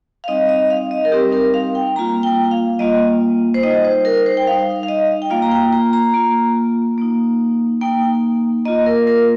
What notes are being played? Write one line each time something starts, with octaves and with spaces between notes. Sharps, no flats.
F5
G3 C4 D#4 D#5
D#5
F5
D#5
A#4
G3 C4 D#4 G4
A#4
F5
G5
G3 A#3 F4 A#5
G5
F5
G3 A#3 F4 D#5
C5
G3 D#4 D#5
C5
A#4
C5
G5
G3 D#4 F5
F5
D#5
G5
A#3 F4 F5
A#5
G5
A#5
A#5
A#3 F4
A#3 D#4
A#3 D#4 G5
A#3 F4 D#5
A#4
A#4